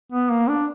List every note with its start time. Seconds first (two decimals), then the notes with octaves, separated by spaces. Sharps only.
0.12 B3
0.30 A#3
0.49 D4